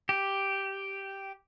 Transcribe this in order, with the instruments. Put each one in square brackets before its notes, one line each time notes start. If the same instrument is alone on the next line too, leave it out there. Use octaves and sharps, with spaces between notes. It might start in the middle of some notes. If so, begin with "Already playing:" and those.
[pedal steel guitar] G4